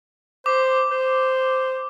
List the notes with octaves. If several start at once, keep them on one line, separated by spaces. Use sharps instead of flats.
C5 D6
C5